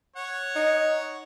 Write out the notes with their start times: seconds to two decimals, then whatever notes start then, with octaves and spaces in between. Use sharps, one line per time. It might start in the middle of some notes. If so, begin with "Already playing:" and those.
0.16 C#5 F#5
0.56 D#4